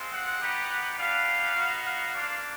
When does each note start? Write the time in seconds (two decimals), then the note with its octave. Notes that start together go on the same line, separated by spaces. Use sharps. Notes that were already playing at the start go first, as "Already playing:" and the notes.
Already playing: G#3 C4 F4
0.11 F#5
0.40 B3 D#4 G4
0.98 B3 D4 G4 F5
1.55 B3 D#4 F#4
1.84 F5
2.13 A#3 D4 F4